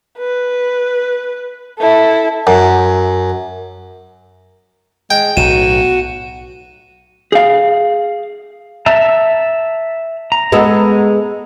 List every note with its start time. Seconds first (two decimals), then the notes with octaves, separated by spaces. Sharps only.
0.19 B4
1.79 E4 A4
2.47 F#2
5.11 G#3 G5
5.37 B1 A2 F#4 D#7 E7
7.32 G#4 F5
8.86 E5 A5 A#5
10.32 A#5
10.52 G#3 B3 A4